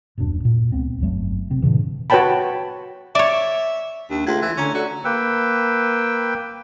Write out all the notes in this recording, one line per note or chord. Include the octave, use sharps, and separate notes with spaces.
D#1 F#2 B2 D4
A#2
C#2 B3 C4
G1 F2 F#3 A3
C3 C4
G2 A#2 C#3 E3
F#4 B4 C#5 G5 A5 B5
C#5 D5 E5
D#2 D4
C#2 A3 C6 G#6
E3
D3 C#4 D4 A#5
F#4 A4 D5 F#5
A#3 B4 G5 E6